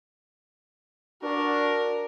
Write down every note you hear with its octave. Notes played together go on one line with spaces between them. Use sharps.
D4 F#4 A#4